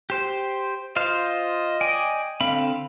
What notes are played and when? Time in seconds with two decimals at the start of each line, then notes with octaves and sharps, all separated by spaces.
0.10 G4 C5
0.96 F4 C5 D#5 F5
1.81 D5 G5 G#5
2.41 D3 C4 F5 B5